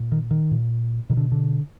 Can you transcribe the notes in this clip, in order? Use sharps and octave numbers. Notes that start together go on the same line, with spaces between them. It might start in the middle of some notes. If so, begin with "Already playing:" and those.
Already playing: A#2
D#3
D#3
A#2
B2 D#3
D3
D3